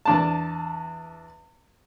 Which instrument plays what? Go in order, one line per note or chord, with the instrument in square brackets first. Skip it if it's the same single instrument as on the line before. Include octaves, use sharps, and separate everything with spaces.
[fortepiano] E2 D4 A5